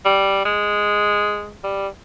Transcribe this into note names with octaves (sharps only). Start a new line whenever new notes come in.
G3
G#3
G3